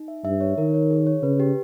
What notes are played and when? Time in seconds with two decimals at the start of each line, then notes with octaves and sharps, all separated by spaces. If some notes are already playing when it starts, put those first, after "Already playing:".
Already playing: D#4
0.08 E5
0.24 G2 E5
0.41 C#5
0.57 D#3 A#4
0.74 C#5
0.90 G#4
1.07 C#5
1.22 C#3 B4
1.40 G4